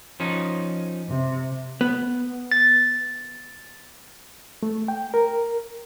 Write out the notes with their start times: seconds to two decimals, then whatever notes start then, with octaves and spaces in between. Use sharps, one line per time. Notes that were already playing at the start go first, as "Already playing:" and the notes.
0.20 F3 C#4 D#4
1.09 C3
1.81 B3
2.51 A6
4.63 A3
4.88 G5
5.14 A#4